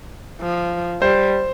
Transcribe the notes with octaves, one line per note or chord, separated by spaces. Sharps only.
F3
G3 C5